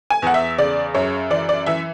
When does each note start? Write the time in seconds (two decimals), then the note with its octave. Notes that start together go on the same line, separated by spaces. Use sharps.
0.10 G#5
0.22 E2 F#5
0.34 E5
0.58 C#3 D5
0.95 F#2 C#5
1.30 E3 D5
1.49 D5
1.66 E3 E5